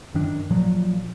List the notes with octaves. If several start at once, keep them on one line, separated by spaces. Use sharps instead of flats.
F#2 D#3 D4
A#2 F3 F#3